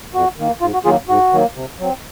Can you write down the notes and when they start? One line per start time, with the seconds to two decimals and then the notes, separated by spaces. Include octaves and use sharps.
0.14 F2 F#4
0.38 D#3 A#3
0.61 G#2 F4
0.74 F#4
0.85 D#3 F#3 A#3 F4 G#4
1.09 G#2 F#4
1.33 D#3 F#3 A#3
1.56 C3
1.80 F#3 C4